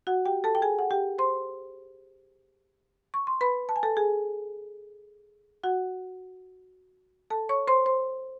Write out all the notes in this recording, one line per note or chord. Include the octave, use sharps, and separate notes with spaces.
F#4 F#5
G4 G5
A4 A5
G5
G#4 G#5
F#5
G4 G5
C5 C6
C#6
C6
B4 B5
A5
G#5
A4 A5
G#4 G#5
F#4 F#5
A4 A5
C#5 C#6
C5 C6
C5 C6